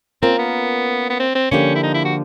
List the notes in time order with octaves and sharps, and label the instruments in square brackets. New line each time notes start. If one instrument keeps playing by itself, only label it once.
[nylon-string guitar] A#3 C#4 F4 A#4 [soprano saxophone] C4
[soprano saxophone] B3
B3
C4
C4
[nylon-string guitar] D3 F3 A#3 D4 G4 [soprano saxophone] C#4
[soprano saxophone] E4
D#4
E4
F#4